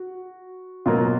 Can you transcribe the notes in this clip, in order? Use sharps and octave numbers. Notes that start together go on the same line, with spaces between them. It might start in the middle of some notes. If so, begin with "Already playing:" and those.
Already playing: F#4
B2 F#3 A#3 F4